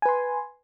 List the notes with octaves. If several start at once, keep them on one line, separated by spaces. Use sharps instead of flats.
B4 G#5 C6